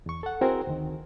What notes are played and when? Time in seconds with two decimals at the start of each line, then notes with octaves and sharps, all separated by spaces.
0.06 E2 C#6
0.23 A4 F#5
0.41 C4 E4 F#4 G#4 A#4 C5
0.67 D2 D#3